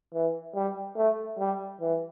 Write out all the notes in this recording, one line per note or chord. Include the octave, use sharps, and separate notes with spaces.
E3
G3
A3
G3
E3